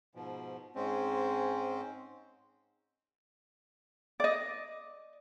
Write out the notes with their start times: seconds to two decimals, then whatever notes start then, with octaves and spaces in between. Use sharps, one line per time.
0.15 G#2 B2 F3
0.75 G#2 G#3 C4 C#4
4.20 D5 D#5